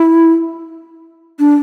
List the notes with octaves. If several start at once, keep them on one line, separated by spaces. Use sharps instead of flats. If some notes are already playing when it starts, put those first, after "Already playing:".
Already playing: E4
D4